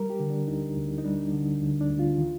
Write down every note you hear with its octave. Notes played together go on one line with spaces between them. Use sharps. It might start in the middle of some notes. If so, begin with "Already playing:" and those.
Already playing: G3 A#4
G4
D3
D4
D2 D#4
D2
D#4
G3 D4
D3
D2
D4
D2
F4
D#3